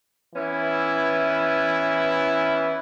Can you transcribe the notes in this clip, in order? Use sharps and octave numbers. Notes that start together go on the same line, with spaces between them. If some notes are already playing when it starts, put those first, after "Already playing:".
E3 B3 C#4 E4